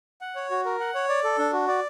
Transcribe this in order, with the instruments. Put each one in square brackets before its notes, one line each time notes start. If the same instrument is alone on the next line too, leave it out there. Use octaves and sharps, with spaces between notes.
[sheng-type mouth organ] F#5
C#5
F#4
A#4
F#5
C#5
D5
A4
D4
F#4
D5